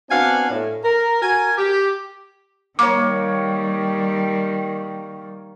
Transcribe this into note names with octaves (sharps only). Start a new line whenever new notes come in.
B3 C4 D4 F#4 F5 G#5
A2
A#4
F#4 A#4 G#5
G4
D#3 G3 A#3 C#5 D6